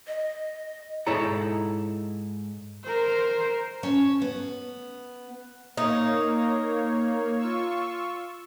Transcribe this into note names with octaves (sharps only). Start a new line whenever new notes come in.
D#5
G#2 D#4 E4 A4 C#5 A#5
A#4 C5
C#4 C#5 A5
B3
A#3 D#4 C#5
F4 C#6 E6